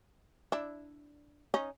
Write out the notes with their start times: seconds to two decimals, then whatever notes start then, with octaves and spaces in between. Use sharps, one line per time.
0.52 D4 E4
1.54 C#4 D#4